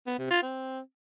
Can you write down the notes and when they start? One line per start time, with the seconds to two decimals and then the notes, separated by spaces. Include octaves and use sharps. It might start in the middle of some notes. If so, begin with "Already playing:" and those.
0.07 B3
0.19 C3
0.30 F4
0.42 C4